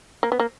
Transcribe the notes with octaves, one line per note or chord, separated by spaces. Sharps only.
A#3
B3
A#3